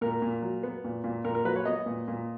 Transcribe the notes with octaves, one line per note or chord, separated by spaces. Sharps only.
A#2 A#4
A#2
F#3
B3
A#2
A#2
A#2 A#4
A#4
F#3 B4
C#5
B3 D#5
A#2
A#2